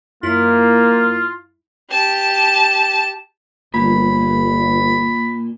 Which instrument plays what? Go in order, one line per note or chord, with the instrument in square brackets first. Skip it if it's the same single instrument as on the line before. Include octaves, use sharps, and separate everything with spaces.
[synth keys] F#2 E4 [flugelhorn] A#3 [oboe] F4
[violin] G4 A5
[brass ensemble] G1 [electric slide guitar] A#2 [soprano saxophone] B5